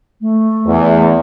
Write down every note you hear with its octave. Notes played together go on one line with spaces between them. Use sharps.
A3
E2